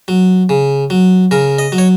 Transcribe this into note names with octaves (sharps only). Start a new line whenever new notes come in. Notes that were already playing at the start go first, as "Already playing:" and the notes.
F#3
C#3
F#3
C#3 A#4
D#5
F#3
C#5